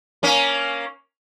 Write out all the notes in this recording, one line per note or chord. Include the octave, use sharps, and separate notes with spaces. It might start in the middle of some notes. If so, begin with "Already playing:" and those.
A#3 C#4